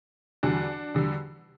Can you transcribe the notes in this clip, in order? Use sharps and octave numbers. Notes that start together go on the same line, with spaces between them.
E2 D3 G3 D4 F#4
E2 D3 G3